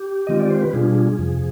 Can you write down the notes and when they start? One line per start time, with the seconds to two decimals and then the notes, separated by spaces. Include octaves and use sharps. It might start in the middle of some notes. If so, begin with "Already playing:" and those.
Already playing: G4
0.27 D#3 G#3 C4 F4 D#5
0.39 D5
0.50 C5
0.62 B4
0.73 B2 G3 D4 F4 G#4
1.18 F2 C3 F3